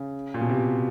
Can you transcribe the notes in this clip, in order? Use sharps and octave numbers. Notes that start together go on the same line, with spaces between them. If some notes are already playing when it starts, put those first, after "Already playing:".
Already playing: C#3
A#2
B2
C3